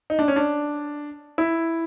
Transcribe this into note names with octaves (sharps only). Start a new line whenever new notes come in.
D#4
D4
C#4
D4
E4